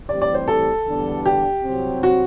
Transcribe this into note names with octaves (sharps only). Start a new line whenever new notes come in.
A2 E3 G3 C4 G4 D5
D5
C5
A4
E2 D3 G3 B3 D4
G4
C2 C3 F#3 C4
F#4